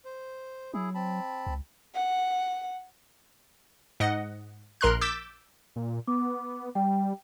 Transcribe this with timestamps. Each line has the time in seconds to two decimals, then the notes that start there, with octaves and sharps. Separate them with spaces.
0.05 C5
0.74 F#3 E4 G#4
0.95 C4 A5 B5
1.47 C#2
1.94 F#5
4.00 G#2 D#5 F#5
4.81 A#1 A#4 A#5 C6 F6 F#6
5.01 D6 E6 G6 A6 B6 E7
5.76 A#2
6.07 B3 D6
6.75 G3 G5